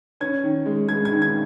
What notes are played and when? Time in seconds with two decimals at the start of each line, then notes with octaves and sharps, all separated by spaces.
0.21 C#4 G#6
0.43 D#3
0.66 G#3
0.88 G#3 G#6
1.05 G#6
1.11 D#3
1.22 G#6